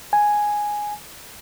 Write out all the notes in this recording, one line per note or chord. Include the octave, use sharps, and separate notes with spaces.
G#5